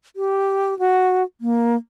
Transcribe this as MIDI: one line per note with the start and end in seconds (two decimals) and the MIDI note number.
0.16 0.77 67
0.79 1.23 66
1.41 1.76 58